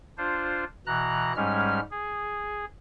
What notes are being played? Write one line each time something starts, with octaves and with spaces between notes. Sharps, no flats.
D4 F4 C5
B2 E3 A#5 F#6
G#2 G3 G#3 C#4 F6
G#4